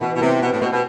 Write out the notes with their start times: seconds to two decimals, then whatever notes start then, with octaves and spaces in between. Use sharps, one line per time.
0.01 B2 E3
0.15 B2
0.21 C3 B3
0.41 B2 G4
0.52 A2
0.62 B2 C4
0.72 B2